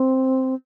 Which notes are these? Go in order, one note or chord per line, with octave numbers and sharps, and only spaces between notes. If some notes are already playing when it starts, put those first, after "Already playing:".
Already playing: C4